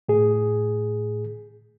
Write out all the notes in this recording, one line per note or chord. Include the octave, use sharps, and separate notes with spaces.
A2 G#4